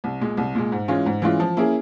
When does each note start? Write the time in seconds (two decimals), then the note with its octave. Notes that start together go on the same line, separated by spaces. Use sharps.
0.04 C2
0.21 A#2 G#3
0.37 C2
0.55 A#2 G#3
0.72 G#2
0.88 E3 G#3 C#4 F4
1.06 G#2
1.22 E3 G#3 C#4 F4
1.40 F3
1.57 A#3 C#4 E4 G#4